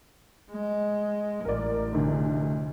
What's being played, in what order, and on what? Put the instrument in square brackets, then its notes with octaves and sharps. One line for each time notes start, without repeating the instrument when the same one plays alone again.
[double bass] G#3
[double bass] A1 [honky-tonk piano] A#4 D5
[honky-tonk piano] F1 D2 D3